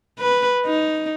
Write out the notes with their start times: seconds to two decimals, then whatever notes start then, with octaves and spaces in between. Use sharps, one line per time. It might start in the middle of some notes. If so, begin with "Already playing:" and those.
0.19 B4
0.65 D#4